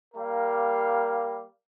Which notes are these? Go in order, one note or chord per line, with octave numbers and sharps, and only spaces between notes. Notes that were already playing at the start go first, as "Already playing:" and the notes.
G3 A#3 A#4 F5